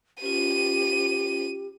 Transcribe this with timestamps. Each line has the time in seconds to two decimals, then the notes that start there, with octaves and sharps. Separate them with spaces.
0.22 C#4 F4 G4 D#7